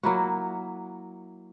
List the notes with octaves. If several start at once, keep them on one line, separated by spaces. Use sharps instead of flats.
F#3 A#3 E4 F#4